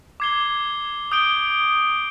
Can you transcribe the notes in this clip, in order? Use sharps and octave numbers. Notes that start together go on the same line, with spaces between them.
D6 G#6 C7 G7
D#6 G6 D7 G7